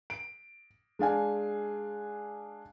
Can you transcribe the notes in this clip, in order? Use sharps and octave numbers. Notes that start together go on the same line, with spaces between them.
D7
G#3 D4 F5 G#5